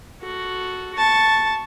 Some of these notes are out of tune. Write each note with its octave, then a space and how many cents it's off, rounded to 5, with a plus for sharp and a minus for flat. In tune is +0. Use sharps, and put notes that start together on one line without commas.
F#4 +0 A4 +0
A5 +0 C#6 +0